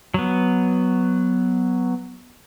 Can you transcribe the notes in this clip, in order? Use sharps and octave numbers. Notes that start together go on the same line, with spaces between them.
F#3 B3